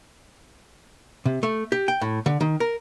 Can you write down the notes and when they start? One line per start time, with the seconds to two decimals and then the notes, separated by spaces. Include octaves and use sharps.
1.26 C3
1.43 A3
1.72 G4
1.88 G5
2.01 A2
2.26 D3
2.41 D#3
2.60 A#4